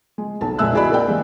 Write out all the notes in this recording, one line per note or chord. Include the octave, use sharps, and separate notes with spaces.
G#3
B1 A5
F1 A#2 G#3 E5 E6 F#6
E4 F#4 G#4 D5 D#5 B5
A#3 A#4 D5 G5
E3 G3 G#3 A#3